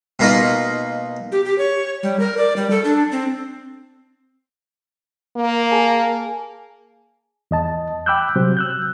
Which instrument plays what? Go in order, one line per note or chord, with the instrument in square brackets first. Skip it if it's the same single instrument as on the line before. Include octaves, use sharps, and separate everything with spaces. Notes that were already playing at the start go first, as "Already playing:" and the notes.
[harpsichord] B2 A#3 D#4 F4
[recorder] G4
G4
C#5
G3
A#4
D5
G3
A4
D4
C4
[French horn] A#3
[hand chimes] G#4 G#5 A5
[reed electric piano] E2 D#5 A5
G5 B5 D6 E6 F#6 G6
C3 F#3 C5
E6 F#6 G6